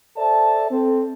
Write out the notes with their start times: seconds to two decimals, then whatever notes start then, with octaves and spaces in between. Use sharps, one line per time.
0.18 A4 C5 D5 E5 A5
0.71 C4 A4